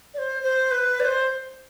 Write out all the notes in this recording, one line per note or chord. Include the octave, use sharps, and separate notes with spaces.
D5
C5
C5
B4
D5
C5